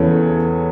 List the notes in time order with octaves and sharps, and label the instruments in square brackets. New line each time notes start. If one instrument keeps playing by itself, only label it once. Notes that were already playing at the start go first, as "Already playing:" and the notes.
Already playing: [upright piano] E2 C#3 E3 A4 B4 C#5